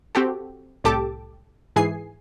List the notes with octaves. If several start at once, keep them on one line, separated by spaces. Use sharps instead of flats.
C4 F#4 G4 A4
C2 A2 G4 A4 A5 D6
G#2 E3 G#4 G#5 C7